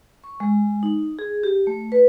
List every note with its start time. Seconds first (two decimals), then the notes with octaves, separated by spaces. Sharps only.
0.24 C#6
0.40 G#3
0.83 D#4
1.19 G#4
1.43 G4
1.67 A3
1.92 B4